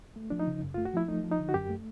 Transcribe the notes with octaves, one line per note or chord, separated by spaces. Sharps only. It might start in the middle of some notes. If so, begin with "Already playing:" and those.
A3
F3 D4
D#4
C#3
F#2
A3 F4
F#4
F3 E4
A3 D#4
F3
D#4
D3
F#4
F#2 G4
A3